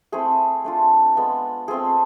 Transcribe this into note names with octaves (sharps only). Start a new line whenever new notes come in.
A3 C4 E4 G#4
A3 D4 F4
G#3 B3 F4
A3 C4 F4 G#4